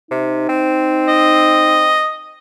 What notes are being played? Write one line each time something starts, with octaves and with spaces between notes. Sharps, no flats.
C3 D#4
C4
D#5